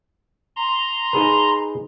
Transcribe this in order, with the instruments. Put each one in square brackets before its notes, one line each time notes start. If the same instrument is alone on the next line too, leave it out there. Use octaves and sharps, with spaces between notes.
[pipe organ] A#5 C6
[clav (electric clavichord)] D#4 G#4 B4